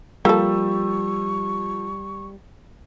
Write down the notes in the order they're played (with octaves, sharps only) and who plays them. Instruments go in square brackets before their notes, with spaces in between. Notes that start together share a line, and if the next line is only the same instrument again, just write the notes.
[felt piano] F3 E6 [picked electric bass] G3 [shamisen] A#3 A4 [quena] C#6